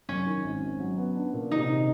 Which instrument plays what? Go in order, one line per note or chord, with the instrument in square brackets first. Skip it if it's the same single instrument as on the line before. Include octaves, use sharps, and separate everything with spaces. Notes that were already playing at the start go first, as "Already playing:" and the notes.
[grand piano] F#2 [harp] C#4
[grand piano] D#3
G#1
G#1
F#3
B3
D4
A#2
[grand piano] C3 [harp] D#4
[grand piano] D#3